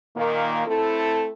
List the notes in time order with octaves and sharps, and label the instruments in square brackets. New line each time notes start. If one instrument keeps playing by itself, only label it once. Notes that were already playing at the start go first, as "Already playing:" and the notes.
[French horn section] A#2 D#3 A#3
A3 C4 E4 A4